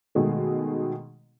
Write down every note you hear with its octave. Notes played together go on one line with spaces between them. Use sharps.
B2 D#3 G#3 A3